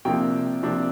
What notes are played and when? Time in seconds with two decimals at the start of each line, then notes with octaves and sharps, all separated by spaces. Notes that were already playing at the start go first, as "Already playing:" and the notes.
0.05 C3 F3 A#3 D4 G5
0.63 C3 F3 A#3 D4